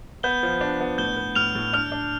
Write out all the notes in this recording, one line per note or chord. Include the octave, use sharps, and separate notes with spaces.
B3 G6 G7
F3
D4
B3
A2 G6 G7
B3
A2 F6 F7
A2
D4 F6 F7
D4